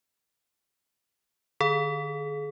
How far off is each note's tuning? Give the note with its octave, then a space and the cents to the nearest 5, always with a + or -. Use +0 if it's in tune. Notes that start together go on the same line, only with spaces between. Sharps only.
D3 +40 G#4 +35